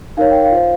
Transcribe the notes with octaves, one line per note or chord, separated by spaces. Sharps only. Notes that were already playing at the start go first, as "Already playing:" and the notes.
D#4 A#4 C#5 F5
G5
F5
F4 C5